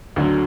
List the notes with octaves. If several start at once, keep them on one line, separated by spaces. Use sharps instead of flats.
D2 D3 F#3